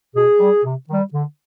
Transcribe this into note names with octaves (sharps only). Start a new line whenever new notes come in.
B2 G#4
G3
C3
D#3 G3
D3